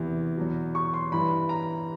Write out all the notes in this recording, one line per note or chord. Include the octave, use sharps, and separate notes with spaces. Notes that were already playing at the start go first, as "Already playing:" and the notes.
Already playing: E2 C3 E3
E2 B2 F#3
C#6
C6
G2 E3 B5
A#5